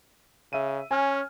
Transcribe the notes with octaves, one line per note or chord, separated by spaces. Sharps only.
C#3 E5 D#7
C#4 G#5 F6